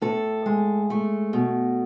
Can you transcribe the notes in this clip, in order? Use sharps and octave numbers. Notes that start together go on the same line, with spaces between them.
A2 A4
G#3
A3
B2